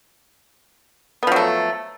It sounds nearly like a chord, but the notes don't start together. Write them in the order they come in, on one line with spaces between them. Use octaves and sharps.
B3 F3 F#3 A3